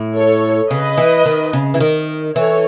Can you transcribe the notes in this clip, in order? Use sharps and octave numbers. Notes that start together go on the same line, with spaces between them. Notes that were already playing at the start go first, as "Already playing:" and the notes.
Already playing: A2
A4 C#5
C#3 B4 D#5
E3
D#3
C#3
E3
D#3
E3 A4 C#5